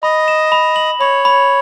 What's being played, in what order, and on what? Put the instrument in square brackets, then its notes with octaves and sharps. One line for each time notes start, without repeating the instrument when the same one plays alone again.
[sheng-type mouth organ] D#5 [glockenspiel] B5
[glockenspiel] E7
B5
F#7
[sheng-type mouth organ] C#5 [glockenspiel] B5
[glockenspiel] B5